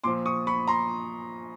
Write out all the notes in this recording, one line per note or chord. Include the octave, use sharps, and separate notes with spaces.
A#2 F3 C6 D6
C#6 D#6
B5 C#6
A#5 C6